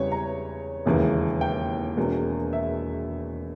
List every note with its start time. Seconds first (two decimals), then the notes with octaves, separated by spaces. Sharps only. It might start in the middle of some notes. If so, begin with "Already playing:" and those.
Already playing: E2 C#3 E3 G3 B4 C#5
0.12 A#5
0.86 E1 D#2 C#3 E3
1.41 G5
1.97 E1 E2 B2 A#3
2.53 E5